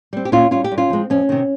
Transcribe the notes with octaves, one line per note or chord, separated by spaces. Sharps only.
G3 C4
G4
A#2 C#4 F4
G3 C#4 F4
G4
G2
C#4 F4
F3 G#3 C4
F2 C#4
C3 D#3